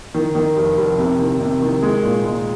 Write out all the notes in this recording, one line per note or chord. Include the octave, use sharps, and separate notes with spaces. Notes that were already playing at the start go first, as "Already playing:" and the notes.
D#3
D#3
F1
F1
C3
D#3
C3
D#3
G#3
A#2
G#3